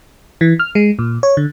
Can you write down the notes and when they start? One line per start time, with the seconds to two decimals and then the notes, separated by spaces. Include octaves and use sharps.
0.41 E3
0.59 F6
0.75 G#3
0.99 A#2
1.23 C#5
1.37 D3